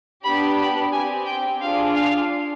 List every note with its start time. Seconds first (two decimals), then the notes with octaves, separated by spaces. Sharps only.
0.24 B3 D4 G4 B5
0.58 B5
0.92 C4 G4 G#5
1.26 G5
1.61 D4 F4 G#4 F5
1.95 F5